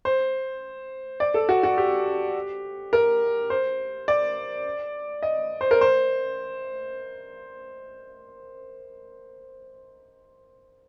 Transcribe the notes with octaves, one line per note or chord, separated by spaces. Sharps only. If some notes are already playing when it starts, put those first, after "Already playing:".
C5
D5
A4
F#4
F#4
G4
A#4
C5
D5
D#5
C5
A#4
C5